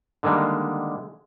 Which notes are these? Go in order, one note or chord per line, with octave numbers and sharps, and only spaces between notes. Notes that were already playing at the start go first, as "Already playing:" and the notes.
D3 D#3 G3 G#3 A#3